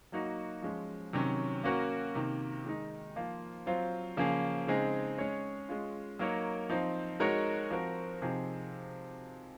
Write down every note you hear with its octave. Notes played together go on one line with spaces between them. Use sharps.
F#3 A#3 D#4 F#4
F3 G#3 C#4
C3 D#3 F#3 C#4
A#3 C#4 F#4 A#4
C3 D#3 A#3
D#3 G#3 D#4
F3 A#3 F4
F#3 C4 F4 C5
C#3 F3 A#3 C#4 G#4
C#3 G#3 C4 D#4 G#4
G#3 C#4 G#4 C#5
G#3 C#4 F4
F#3 A#3 D#4 A#4 C#5
F3 C4 D#4
G#3 D#4 F#4 A#4 C#5
F3 C4 F#4 A#4
C3 F3 C4 D#4 G#4